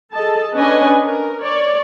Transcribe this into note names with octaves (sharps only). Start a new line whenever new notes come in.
G#4 A4 D#5 A5
C#4 D4 B4 D#5 G#5
A#4
C#5 D5